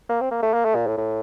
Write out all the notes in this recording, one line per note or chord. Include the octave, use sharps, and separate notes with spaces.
A#3
C4
A#3
A3
A#3
A3
A#2
A2
A2